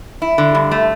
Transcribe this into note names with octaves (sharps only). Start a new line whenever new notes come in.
E4
D3
G2
A3